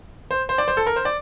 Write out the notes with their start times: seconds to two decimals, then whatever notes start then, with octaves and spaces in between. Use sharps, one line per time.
0.31 C5
0.49 C5
0.58 D5
0.68 C5
0.77 A4
0.87 A#4
0.96 C5
1.05 D5